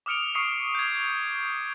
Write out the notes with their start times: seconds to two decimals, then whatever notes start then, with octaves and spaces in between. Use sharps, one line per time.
0.06 D6 D#6 F6 C#7 D7 F7
0.35 C#6 D#6 C7 C#7
0.75 G6 G#6